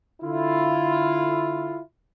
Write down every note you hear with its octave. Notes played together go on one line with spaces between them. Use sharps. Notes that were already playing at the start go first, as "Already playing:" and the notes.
D3 E4 F4